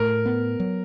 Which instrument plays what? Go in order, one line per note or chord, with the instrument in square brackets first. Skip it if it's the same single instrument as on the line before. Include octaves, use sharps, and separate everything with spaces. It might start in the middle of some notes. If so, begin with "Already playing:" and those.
Already playing: [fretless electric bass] A2 [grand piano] A#4
[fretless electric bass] B3
F#3